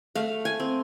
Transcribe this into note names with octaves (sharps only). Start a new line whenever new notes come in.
A3 F5
G#5
C4